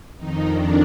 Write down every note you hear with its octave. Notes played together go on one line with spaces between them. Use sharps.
F2 D#3 D#4
D4